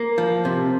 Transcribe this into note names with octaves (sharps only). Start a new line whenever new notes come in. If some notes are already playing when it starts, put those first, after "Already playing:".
Already playing: A#3
F3
C3